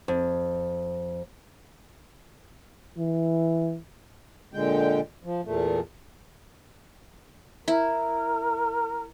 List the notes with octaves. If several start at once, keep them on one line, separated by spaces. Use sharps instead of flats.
F2
E3
A#2 D3 G#3 G5
F3
E2 A#2 A3
E4 A#4